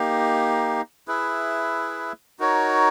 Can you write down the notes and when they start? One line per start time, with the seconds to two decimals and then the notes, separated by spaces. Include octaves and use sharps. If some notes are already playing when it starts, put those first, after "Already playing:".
Already playing: A#3 D#4 G4
1.08 E4 G#4 B4 E5
2.39 D#4 F#4 A#4 C#5